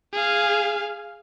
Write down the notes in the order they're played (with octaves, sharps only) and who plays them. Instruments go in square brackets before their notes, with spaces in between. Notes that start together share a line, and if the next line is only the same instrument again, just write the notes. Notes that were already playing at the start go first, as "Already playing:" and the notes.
[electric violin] G#4 F5